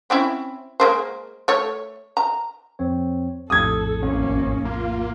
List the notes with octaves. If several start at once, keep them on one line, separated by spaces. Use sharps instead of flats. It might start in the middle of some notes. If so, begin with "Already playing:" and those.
C4 C#4 E4
G#3 A#3 C5
A3 C#5
A#5
F2 C4 C#5
A#1 F2 A2 A4 D#6 G#6
G#1 A#3 C#4
A#3 F4